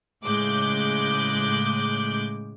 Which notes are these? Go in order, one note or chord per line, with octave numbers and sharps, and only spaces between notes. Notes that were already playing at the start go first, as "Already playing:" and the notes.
A2 C#3 G#3 D6 F#6 G6